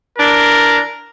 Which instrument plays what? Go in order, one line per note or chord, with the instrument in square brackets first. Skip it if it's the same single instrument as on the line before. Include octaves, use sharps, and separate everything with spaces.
[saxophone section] E3 D4 [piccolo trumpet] A#4